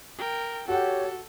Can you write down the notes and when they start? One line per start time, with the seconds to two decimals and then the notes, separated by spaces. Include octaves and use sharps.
0.18 A#4 G5
0.68 F#4 G4 A4 C#5 F#5